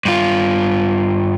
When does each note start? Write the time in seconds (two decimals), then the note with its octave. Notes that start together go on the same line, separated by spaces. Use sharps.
0.05 G2 F4